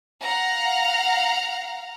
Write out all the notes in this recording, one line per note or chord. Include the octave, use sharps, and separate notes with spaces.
F5 F#5 A#5 F6